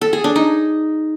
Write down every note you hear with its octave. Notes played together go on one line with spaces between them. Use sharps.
A4
G#4
D4
D#4